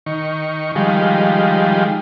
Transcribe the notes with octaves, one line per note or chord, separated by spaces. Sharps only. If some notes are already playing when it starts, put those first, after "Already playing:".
D#3 C#6
D#3 F3 G3 G#3